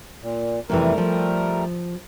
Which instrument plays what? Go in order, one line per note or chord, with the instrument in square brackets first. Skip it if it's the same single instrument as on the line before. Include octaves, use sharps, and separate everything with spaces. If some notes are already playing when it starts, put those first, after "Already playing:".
[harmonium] A#2
[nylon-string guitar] F2 C3 E3 [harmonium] G3 A3 A#4
[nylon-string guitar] F3